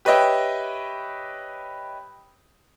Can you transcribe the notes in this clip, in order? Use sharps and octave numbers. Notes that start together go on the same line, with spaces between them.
G4 B4 C#5 D#5 E5 G5